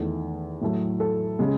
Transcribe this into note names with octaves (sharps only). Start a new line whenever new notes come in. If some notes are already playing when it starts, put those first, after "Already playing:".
Already playing: E2 D#3 A3
A2 F#3 A3
A4
C#3 G#3